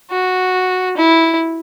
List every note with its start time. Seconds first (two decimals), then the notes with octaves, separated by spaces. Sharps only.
0.11 F#4
0.97 E4